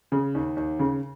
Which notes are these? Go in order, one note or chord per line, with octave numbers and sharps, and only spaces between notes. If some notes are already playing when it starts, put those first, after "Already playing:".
C#3
D#2
D#2
C#3